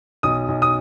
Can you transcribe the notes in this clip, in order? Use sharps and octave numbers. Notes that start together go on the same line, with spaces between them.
B1 D#6
B1
D#6